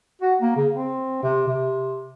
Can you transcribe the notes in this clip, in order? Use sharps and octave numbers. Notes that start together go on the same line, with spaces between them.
F#4
A#3
C#3
C4
C3
C3